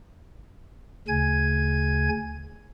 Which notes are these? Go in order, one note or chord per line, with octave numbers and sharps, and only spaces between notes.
D2 C#3 G#5 G#6